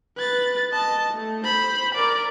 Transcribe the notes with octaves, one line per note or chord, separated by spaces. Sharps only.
B4 A6
D#5 A5
A3
C5 B5
A#4 D5